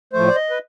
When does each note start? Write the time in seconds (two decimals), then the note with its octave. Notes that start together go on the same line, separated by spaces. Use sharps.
0.13 A2 F3 A3 C5
0.28 D5
0.35 D#5
0.50 B4